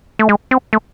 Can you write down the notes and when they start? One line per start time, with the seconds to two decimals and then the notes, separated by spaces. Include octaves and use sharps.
0.19 A3
0.29 G#3
0.51 C4
0.73 A3